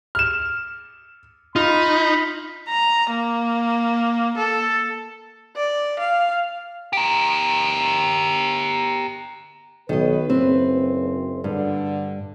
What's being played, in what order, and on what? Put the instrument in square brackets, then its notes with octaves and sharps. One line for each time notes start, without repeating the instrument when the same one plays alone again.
[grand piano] F6 E7
[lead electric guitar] D#4 [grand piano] F4 [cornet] B5
[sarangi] A#5
A#3
A4
[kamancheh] D5
F5
[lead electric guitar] G4 A#4
[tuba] B1 [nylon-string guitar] D#3 D#5 [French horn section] B4
[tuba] F#1 [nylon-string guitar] C4
[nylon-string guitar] G2 [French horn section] D3